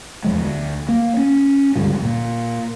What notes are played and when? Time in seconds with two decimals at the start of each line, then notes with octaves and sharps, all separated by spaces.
0.24 E2 F3 G#3
0.39 D2
0.89 A#3
1.17 C#4
1.75 C#2 G2 D3 F3
2.02 A#2